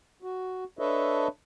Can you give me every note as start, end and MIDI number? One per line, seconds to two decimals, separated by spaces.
0.22 0.64 66
0.79 1.28 62
0.79 1.28 69
0.79 1.28 71
0.79 1.28 73
0.79 1.28 75
0.79 1.28 76